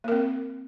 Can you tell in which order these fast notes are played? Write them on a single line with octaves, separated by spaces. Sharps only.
A#3 A#4 C4